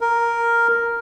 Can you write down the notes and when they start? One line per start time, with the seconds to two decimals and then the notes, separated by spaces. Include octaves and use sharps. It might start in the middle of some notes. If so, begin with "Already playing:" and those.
0.01 A#4